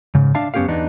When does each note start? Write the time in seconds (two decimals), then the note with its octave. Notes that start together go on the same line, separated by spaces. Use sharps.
0.15 G#2 C#3
0.35 D4 E5 F5 A5
0.54 F#2 B3 C#4 G4 G#4 F5
0.68 E2 B3 D4 D#4